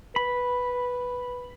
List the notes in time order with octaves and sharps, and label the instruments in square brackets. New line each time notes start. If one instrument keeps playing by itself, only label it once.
[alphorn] B4 [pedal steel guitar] B5